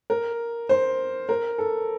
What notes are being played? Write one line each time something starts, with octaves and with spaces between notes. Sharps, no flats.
A#4
C5
A#4
A4